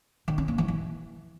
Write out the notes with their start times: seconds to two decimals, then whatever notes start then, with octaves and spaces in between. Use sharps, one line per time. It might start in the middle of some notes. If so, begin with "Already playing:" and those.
0.28 D#3
0.38 C#4
0.48 A#3
0.58 E3
0.68 E3